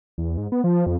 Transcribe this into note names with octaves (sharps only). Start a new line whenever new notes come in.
E2
G#2
B3
F3
F2